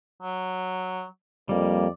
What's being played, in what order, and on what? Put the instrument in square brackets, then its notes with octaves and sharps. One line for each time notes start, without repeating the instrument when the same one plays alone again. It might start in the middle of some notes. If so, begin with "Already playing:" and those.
[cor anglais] F#3
[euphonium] F2 [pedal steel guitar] G3 A#3 [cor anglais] D5